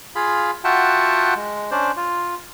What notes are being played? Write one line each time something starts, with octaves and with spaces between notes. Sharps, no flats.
F4 G#4 F5 B5
F4 F#4 E5 F#5 G5 A5
G#3
C#4 D4 C5 D5
F4